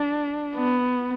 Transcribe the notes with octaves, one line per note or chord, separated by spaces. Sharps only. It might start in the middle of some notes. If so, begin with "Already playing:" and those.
Already playing: D4
B3